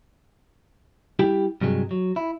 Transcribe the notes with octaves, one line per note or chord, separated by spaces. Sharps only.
G3 E4 G4 G5
G2 C3 F#3 G#3
F#3
E4